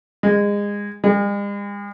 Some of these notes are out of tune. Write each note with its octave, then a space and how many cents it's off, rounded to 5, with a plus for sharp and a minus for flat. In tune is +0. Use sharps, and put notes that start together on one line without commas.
G#3 -25
G#3 -45